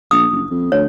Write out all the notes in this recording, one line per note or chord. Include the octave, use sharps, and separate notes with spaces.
A#1 D#6
F#1
F2
D2 C#5